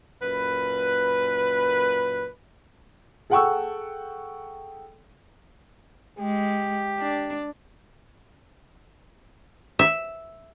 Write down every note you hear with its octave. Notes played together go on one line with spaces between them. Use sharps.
F#2 A#2 B4
G#4 A4 F#5 G5 C#6 E6
G#3 G4
D4
E5